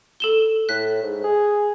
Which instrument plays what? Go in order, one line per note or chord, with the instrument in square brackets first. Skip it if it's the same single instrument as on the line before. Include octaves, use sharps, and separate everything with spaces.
[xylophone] A4 E7 G7
[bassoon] A2 [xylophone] F#6 B6
[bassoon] G#2
G#4